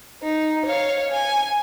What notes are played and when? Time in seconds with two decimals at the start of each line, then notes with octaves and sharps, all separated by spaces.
0.23 D#4
0.66 C#5 F5
1.11 G#5